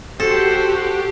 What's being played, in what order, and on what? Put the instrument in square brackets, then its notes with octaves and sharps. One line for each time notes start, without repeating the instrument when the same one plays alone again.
[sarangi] F#4 [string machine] G4 [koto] A4 [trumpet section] C5